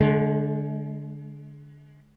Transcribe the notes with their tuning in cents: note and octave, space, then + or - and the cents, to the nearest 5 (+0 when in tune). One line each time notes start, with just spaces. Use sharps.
D3 -10 G#3 +35